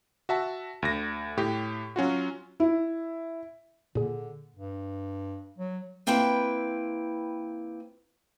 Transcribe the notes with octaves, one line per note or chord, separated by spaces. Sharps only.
F#4 E5 A5
D2 A#6
A2 G4
F#3 C#4 F4 F#4
E4
A#2 D3 G#4
G2
F#3
A#3 C4 E4 B4 G5